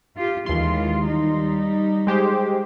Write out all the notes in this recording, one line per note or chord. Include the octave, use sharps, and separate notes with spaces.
F4 G4
D#2 E3 G#3 F4 C6
G3 D#4
G#3 G4 C5